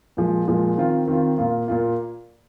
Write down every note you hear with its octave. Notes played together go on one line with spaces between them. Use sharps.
A#2 F3 G#3
A#2 F3 G#3
D#3 C4 F4
D#3 C4 F4
A#2 A#3 F4
A#2 A#3 F4